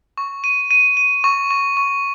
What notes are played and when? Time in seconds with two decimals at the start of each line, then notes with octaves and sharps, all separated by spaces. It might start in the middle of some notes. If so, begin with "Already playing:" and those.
0.18 C#6
0.44 D#7
0.71 D#7
0.97 D#7
1.24 C#6
1.51 C#6
1.77 C#6